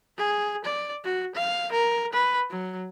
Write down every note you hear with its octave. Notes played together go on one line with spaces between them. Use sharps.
G#4
D5
F#4
F5
A#4
B4
F#3